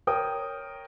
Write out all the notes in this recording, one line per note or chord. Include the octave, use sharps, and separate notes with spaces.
A#4 C#5 G5 D#6